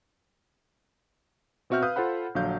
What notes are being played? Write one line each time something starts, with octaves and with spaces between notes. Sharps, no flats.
B2 C4 F#4 E5 F6 G6
B4 F5 D#6 F#6 G6
F4 A4 C5 F#5 B5
A#1 D3 F#3 F5 G6